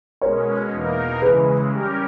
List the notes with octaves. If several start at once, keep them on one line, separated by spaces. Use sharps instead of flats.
B2 G#3 C#4 A#4 C#5
E2 B2 A#3 D#4 A#4
C#3 E3 G#3 G#4 B4
G3 C#4 G4 A#4